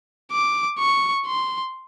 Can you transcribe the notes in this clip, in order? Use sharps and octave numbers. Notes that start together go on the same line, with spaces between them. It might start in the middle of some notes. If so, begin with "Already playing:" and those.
D6
C#6
C6